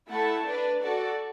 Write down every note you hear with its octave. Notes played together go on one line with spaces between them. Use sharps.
A3 E4 A4 F#5 A5
D4 B4 D5
F#4 A4 D5